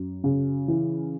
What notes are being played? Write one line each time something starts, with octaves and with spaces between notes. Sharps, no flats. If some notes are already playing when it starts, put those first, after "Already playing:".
Already playing: F#2
C#3
E3